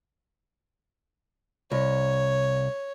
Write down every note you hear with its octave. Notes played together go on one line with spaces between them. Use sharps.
C2 C#5